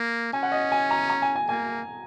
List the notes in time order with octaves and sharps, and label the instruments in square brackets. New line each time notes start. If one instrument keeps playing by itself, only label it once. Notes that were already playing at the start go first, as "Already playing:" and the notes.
Already playing: [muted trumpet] A#3
[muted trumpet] C#4 [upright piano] G#5
[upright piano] F#5
D#5
G#5
A#5
A#5
G#5
G#5
[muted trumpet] A#3 [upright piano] G#5